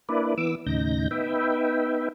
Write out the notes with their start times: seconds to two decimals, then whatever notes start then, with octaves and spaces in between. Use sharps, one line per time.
0.09 A#3 D4 E4 B4 D5
0.38 E3 B3 D6 E6
0.66 D#2 A2 C#3 D#4 G6 A#6
1.11 B3 D#4 B4 E5 G5